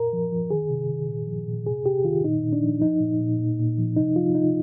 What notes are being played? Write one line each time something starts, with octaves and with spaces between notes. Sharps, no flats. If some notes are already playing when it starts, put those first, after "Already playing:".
Already playing: A#2 A#4
F3
F3
D#3 G#4
C3
D#3
A#2
F3
A#2
C3 G#4
C3 G4
D#3 F4
A#2 D#4
A#2
D4
F3
F3 D#4
A#2
A#2
A#2
A#2
F3
C3 D#4
F3 F4
C3 D#4